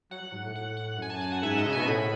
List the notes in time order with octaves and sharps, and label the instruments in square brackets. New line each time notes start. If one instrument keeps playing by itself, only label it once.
[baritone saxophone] F#3 [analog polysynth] F#5
[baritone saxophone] F#3
G#2
A2
[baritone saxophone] A2 [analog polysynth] F#5
[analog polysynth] F#5
[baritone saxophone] F#2 [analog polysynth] G#5
[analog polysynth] A5
G#5
F#5
[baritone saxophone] G#2 [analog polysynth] E5
[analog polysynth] D#5
[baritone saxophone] C#3
[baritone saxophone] B2 [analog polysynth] G#5
[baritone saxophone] A2 [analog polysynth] B5